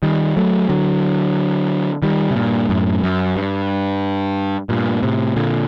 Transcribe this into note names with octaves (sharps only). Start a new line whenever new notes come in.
D#3 G3
F#3 A3
D3 F#3
D#3 G3
C3
G2 A#2
F#2 A2
F#2
G2
G2 A#2
A2 C3
A#2 D3